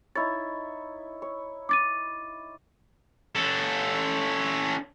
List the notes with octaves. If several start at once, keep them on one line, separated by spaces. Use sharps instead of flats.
D#4 E4 C#5 A6
C#5
D6 A6 D#7
C#4 A4